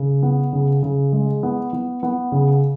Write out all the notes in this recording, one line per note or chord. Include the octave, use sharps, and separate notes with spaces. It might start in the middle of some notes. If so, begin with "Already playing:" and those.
Already playing: C#3
B3
C#3
C#3
G#3
B3
B3
B3
C#3